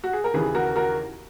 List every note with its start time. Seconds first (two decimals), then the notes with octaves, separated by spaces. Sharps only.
0.04 F#4
0.13 G#4
0.24 A#4
0.34 D#2 C#3 E3 G#4 B4
0.55 F#4 A#4
0.76 F#4 A#4